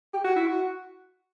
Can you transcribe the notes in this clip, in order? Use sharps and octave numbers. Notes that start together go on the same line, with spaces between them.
G4
F#4
E4
F#4